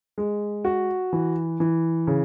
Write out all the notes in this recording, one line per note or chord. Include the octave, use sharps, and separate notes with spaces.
G#3
F#4
E3
E3
C#3